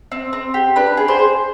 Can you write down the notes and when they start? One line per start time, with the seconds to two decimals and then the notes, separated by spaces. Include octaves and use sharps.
0.12 C4
0.33 C4
0.54 G4
0.76 D4 B4
0.97 G#4
1.08 C5
1.19 G#4